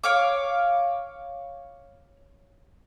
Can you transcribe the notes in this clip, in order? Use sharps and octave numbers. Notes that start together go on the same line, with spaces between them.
C#5 F5 D6